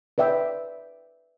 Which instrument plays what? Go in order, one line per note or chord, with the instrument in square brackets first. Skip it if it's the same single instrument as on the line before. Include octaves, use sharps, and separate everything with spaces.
[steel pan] B4 D5 E5 G5